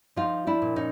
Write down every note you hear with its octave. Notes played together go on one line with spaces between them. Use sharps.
F3 D#4 F4
D4 E4
A#2
C#4 D#4